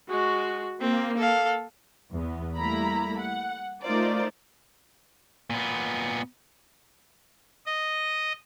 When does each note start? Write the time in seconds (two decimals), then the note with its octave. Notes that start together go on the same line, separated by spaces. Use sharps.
0.10 G#3 F#4
0.81 A#3 C4
1.17 A4 F5
2.12 E2 B3
2.56 G3 A3 A#3 E4 A#5 B5
3.19 F#5
3.83 A3 D#4 F4 A#4 C5 D5
5.50 A#2 B3
7.66 D#5